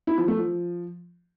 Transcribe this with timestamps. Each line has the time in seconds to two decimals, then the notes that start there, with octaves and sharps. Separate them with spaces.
0.07 E4
0.18 F3
0.28 A3
0.38 F3